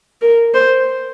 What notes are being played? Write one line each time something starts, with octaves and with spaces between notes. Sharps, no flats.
A#4
C5